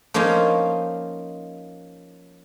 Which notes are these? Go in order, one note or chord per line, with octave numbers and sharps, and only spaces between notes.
F3 A#3 C#4 D#4 F4 D#5